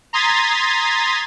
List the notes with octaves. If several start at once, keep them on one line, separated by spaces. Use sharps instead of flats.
A#5 C6 D#6 G#6 A6 B6